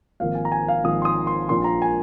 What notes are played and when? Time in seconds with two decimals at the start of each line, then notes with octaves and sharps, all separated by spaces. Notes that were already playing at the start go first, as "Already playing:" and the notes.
0.20 G#1 G#2 F3 A#3 F5
0.35 G#5
0.45 A#5
0.52 G#5
0.68 F5
0.84 G#1 G#2 F3 A#3 D#6
1.02 C6
1.05 D#6
1.27 C6
1.49 A#1 A#2 F3 A#3 C6
1.64 A#5
1.82 G#5